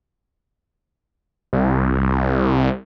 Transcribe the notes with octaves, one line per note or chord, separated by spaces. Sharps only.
C2